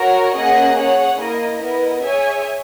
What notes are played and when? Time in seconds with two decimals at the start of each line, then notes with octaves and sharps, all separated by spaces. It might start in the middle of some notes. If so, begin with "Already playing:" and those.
Already playing: F#4 A#4 C#5
0.35 A#3 C#4 G#4 D#5 F#5
0.76 G#4 C#5 F#5
1.19 A#3 E4 A#4 D#5
1.61 B3 E4 A#4 D#5
2.02 G#4 C#5 E5 G#5